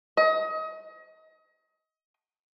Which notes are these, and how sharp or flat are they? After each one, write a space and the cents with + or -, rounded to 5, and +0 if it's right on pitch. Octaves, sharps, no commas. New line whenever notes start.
D#5 +30